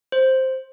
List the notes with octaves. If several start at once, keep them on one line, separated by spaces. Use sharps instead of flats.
C5